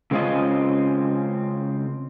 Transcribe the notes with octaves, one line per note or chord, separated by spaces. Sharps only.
C#3 G#3 C4 C#4 F4 D#5